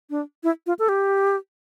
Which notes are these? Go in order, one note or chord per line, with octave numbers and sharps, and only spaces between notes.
D4
E4
F4
A4
G4